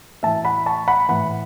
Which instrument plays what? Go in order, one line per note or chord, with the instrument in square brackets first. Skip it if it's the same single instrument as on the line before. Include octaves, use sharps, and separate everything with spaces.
[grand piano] A2 E3 E5 A5
F#5 B5
A5 C#6
F#5 B5
A2 E3 F#5 B5